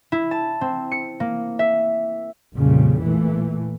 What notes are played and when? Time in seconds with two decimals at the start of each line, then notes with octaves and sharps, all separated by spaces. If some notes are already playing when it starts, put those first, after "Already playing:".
0.12 E4
0.31 A5
0.61 C4
0.92 C#7
1.20 A#3
1.59 E5
2.55 A#1 F2 A#2 C#3 G3
3.03 A#2 E3 A3